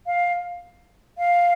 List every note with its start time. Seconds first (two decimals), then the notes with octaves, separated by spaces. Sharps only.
0.06 F5
1.18 F5